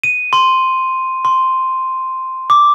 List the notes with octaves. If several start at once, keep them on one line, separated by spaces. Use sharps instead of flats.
D#7
C6
C6
D6